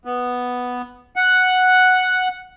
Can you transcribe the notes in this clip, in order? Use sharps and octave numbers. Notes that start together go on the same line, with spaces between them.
B3
F#5